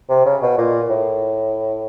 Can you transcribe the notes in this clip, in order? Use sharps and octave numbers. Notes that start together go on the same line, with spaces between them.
C3
C#3
B2
A#2
A2